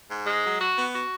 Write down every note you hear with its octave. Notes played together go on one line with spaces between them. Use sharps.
G#2
G#3
F#3
F#4
B3
F#4